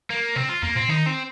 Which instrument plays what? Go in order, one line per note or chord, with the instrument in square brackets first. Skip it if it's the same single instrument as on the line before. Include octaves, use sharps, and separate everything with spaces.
[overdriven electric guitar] A#3
[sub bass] C3 [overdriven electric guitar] C4
[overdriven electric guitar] F4
[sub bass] F2 [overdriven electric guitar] A#3
[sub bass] A#2 [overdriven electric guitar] C4
[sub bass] D#3 [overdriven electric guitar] D#4
[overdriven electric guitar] C4